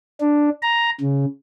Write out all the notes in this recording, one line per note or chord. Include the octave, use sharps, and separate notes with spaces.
D4
A#5
C#3